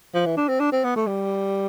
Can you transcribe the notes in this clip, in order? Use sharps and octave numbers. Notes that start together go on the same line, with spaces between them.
F3
E3
D4
C4
D4
C4
B3
A3
G3